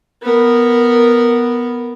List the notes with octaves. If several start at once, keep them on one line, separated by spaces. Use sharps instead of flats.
B3 A#4